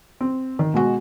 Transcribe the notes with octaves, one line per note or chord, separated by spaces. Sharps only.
C4
D#3
B2 G#3 F#4